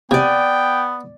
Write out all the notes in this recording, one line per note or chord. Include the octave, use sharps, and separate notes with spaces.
C3 B3 D5 G5 G#5